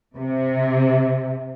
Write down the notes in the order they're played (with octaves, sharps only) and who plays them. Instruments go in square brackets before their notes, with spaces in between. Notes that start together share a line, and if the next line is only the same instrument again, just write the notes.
[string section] C3